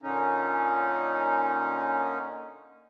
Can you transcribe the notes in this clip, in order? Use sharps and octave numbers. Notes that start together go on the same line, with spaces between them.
A#2 D3 C#4 D#4